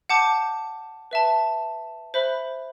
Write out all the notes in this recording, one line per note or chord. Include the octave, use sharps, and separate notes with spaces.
F#5 A5 D6 G6
B4 E5 A5
C5 E5 B5 F#6